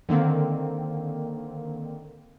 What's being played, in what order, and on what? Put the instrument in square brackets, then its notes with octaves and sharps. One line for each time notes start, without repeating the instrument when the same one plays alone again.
[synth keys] D3 D#3 A#3 C4